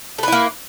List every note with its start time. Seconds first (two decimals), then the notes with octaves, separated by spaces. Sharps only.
0.18 A3
0.23 B4
0.28 E4
0.32 A#3